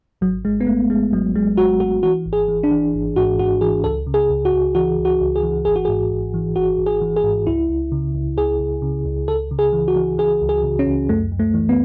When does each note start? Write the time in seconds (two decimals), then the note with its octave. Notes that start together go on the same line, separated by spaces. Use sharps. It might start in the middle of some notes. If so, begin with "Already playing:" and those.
0.21 G#1 F#3
0.45 G#1 G#3
0.60 B3
0.67 G#1 A3
0.90 G#1 G#3
1.13 G#1 F#3
1.35 G#1 G#3
1.57 G#1 F#4
1.80 G#1 F#4
2.03 E3 F#4
2.26 G#1
2.33 G#4
2.48 E3
2.63 D4
2.71 E3
2.94 G#1
3.16 G#2 F#4
3.39 G#2 F#4
3.61 E3 G#4
3.84 C#2 A4
4.07 C#3
4.14 G#4
4.29 C#2
4.45 F#4
4.53 C#2
4.75 E3 F#4
4.98 C#2
5.05 F#4
5.20 C#2
5.36 G#4
5.43 E3
5.65 G#1 G#4
5.76 F#4
5.85 G#2 G#4
6.11 G#1
6.34 E3
6.56 G#1 F#4
6.78 G#1
6.86 G#4
7.01 E3
7.16 G#4
7.23 G#2
7.47 C#2 E4
7.69 C#2
7.92 C#3
8.15 C#2
8.38 C#2 G#4
8.59 C#2
8.82 C#3
9.05 C#2
9.28 C#2 A4
9.51 C#3
9.59 G#4
9.73 E3
9.88 F#4
9.96 E3
10.18 E3 G#4
10.41 C#2
10.49 G#4
10.63 C#3
10.79 C#4
10.86 C#2
11.09 F#2 A3
11.32 F#2
11.39 A3
11.54 E3
11.69 B3